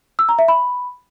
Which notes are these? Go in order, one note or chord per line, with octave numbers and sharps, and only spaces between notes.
E6
A#5
E5
B5